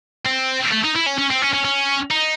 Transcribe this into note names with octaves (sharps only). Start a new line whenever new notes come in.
C4
A3
D#4
E4
C#4
C#4
C4
C#4
C#4
C#4
D#4